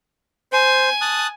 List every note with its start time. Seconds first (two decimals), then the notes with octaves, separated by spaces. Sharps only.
0.53 C5 G#5
1.01 A5 D#6 F#6